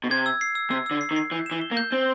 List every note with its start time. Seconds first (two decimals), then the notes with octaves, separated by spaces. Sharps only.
0.04 B2
0.10 C3 G#6
0.26 E6
0.41 C7
0.55 E6
0.71 C3 E6
0.86 D3 E6
1.01 C7
1.11 D#3
1.16 C7
1.31 E3 G6
1.46 E7
1.51 E3
1.61 G7
1.71 A#3
1.77 G6
1.92 C4 G7